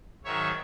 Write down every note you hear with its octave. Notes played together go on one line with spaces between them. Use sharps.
G#2 D#3 F#3 C#5 E5